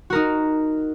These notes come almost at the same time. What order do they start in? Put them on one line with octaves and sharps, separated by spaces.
F#4 A#4 D#4